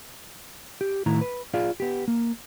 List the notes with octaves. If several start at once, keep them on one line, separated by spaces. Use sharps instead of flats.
G4
A2 D#3 E4 A#5
B4
F4 G#4 D5 F5
B3 G4
A#3